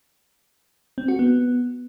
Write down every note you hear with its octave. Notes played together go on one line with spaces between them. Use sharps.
C4
F#4
B3